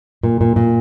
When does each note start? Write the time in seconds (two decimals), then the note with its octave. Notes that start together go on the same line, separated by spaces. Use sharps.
0.23 A#2
0.41 A#2
0.56 A#2